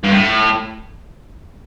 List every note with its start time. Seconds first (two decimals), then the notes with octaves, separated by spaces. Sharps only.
0.04 G2
0.12 A2